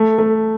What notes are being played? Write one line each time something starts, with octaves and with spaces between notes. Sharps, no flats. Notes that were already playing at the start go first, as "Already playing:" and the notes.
Already playing: A3
A3